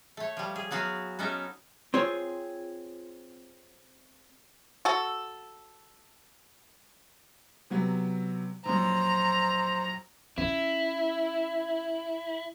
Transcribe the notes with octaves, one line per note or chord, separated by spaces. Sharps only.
A3 C#5
F3 G3
G#4
F#3 B3 F#4 G#4 F5
B3 C#4 D#4 A4 A#4
C4 F4 G#4 C#5
F#4 A4
C3 F#3 B3
A#1 F#2 C5 A#5
C#4 E4